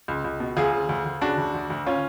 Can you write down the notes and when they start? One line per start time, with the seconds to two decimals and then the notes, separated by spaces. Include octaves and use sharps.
0.08 C#2
0.24 C#2
0.40 B2
0.57 D2 F4 G#4
0.73 C#3
0.89 D2
1.05 D2
1.21 C#3 D4 F#4
1.38 D2
1.54 D2
1.70 D2
1.86 C#4 F4